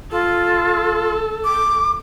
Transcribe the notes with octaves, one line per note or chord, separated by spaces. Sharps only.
F4 A4
D6